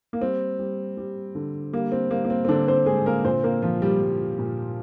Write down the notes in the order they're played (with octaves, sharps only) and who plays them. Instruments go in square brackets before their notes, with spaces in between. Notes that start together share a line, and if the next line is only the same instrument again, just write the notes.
[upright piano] A#3
G3 C4
G3
G3
D3
G3 A#3
C4
G3 A#3
A#3
C4
C4
D3 D4
C4 C5
D3 G#3 G#4
A#3 A#4
A#2 C4 C5
A#3 A#4
A#2 F3 F4
G3 G4
G3
A#2